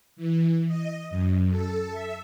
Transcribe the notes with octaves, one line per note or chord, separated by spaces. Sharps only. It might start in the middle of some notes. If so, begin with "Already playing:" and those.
E3
D#5
F#2
A4
E5